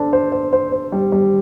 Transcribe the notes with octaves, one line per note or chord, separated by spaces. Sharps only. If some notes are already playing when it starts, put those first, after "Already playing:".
Already playing: D4 A4 C5
C5
C5
C5
C5
G3
G3